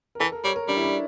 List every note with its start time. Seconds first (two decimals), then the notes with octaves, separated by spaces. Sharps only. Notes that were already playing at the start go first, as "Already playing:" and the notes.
0.15 A#4
0.20 E3 A4
0.32 A#4
0.44 G3 C#5
0.56 A#4
0.68 G3 D4
0.77 E4
0.84 D4